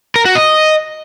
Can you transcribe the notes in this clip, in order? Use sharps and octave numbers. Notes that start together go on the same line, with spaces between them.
A#4
F#4
D#5